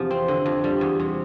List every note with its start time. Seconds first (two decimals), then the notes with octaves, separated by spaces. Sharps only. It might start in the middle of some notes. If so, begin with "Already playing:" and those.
Already playing: E2 C3 F3
0.11 C4
0.28 D3
0.46 F2
0.64 G3
0.81 E2
1.00 C3